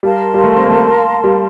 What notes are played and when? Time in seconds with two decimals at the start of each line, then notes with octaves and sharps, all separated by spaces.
0.03 G3 A#4 F5 A5 C6
0.34 G3
0.44 A3
0.57 C4
0.66 A#3
0.71 A3
1.24 G3